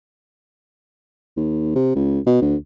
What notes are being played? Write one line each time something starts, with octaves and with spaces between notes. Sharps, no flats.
D#2
C3
C#2
B2
D2